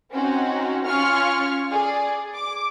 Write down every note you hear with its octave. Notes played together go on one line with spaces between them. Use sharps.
C4 C#4 D#4 F#4
C#4 F4 C#6 F6
G#4 D5
D6